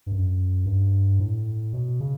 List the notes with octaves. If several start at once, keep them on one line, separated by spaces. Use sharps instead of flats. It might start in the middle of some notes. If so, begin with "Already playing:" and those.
G2
F#2
G2
A2
B2
C#3